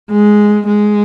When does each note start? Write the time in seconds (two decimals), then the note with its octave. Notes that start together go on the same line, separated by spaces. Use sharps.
0.11 G#3
0.67 G#3